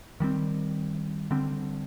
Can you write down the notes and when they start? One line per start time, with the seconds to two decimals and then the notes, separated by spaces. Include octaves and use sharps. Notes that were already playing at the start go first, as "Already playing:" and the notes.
0.20 D#3 G3 C4
1.31 D3 G3 C4